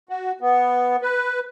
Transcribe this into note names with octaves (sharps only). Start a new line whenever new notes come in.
F#4
B3
B4